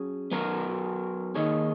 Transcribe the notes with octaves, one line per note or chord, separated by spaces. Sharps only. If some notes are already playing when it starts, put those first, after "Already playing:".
Already playing: F#3 C#4 G#4
F#3 B3 F#4 A#4
D#3 A#3 D#4 G#4 C#5